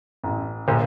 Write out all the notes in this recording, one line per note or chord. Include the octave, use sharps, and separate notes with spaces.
A1
A#1